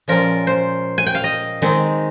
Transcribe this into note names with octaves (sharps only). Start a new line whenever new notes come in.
A#2 F3 G#3 C#4 A#4
C5
G#5
G5
F5
D#5
D#3 G#3 C4 D#4